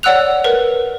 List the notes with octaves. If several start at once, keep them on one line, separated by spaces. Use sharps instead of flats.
C#5 D5 F#5 E6 F#6 F7
A#4 B4